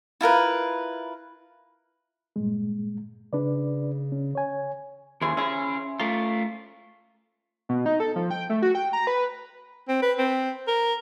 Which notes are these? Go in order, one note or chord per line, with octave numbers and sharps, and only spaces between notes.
E4 F4 A#4 B4
G2 A#2 G#3
C#3 D4 B4 D5
C#4
C#5 G#5
D#2 C#4 E4 G#4 C5
C#4 E4 G#4 E6
A3 F4 A#5
B2
D#4
A4
F3
G5
A3
F#4
G5
A#5
B4
C4
B4
C4
A#4